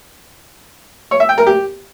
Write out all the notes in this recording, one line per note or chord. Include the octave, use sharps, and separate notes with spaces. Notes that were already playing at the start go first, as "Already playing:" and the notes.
C#5
E5
G5
A#4
G4